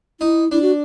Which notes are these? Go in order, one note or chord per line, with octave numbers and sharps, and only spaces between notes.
D#4 E4
D4 E4
F#4